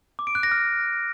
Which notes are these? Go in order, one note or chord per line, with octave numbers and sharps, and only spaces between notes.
D6
D7
F#6
A#6
F6